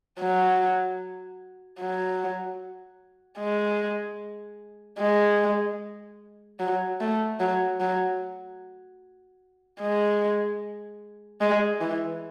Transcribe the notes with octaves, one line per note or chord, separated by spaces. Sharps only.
F#3
F#3
G#3
G#3
F#3
A3
F#3
F#3
G#3
G#3
E3